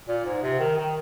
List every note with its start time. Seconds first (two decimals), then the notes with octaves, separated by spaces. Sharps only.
0.08 A#2
0.25 G#2
0.43 C3
0.60 D#3
0.77 D#3